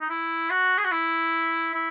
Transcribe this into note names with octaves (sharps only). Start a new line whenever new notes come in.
D#4
E4
F#4
G#4
F#4
E4
E4